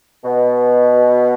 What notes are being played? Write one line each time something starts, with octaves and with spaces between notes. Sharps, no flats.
B2